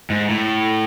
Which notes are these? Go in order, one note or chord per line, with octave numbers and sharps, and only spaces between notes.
G#2
A2